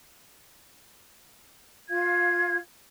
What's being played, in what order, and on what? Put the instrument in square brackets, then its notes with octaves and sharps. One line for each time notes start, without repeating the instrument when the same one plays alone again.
[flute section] F4 F5 G#6